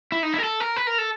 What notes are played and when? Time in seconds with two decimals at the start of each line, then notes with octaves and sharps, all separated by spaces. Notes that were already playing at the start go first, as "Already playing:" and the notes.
0.12 E4
0.23 D#4
0.34 E4
0.40 A#4
0.44 A4
0.60 A#4
0.76 B4
0.87 A#4
0.98 A4